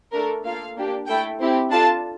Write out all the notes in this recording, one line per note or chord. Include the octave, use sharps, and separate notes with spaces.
A3 D4 A4 A#4
A#3 F4 A4 F5
A#3 D4 G4
A3 E4 A4 G5
C4 E4 G4
D4 F4 A4 A5